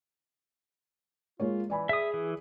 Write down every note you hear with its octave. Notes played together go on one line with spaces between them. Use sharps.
G#3 A#3 F4 C#5
E3 D5 G#5 B5
G#4 E5 D#6
E3